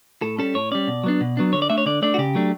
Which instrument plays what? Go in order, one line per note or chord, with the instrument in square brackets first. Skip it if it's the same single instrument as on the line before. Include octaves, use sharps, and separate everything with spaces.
[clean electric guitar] A2 A4
G3 C#4 A4
A2 C#5
G3 C#4 D5
B2
F#3 B3 D4
B2
F#3 B3 D4
D3 C#5
D5
A3 D4 E5
C#5
D3 D5
A3 D4 D5
F#4
C#3 G4
F#3 A3 D4